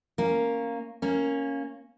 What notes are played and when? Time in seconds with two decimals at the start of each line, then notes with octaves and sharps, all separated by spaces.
0.18 A#3 C#4
1.02 A#3 C#4